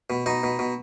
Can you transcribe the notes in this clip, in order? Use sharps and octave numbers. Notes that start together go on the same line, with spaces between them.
B2
B2 D#4
B2
B2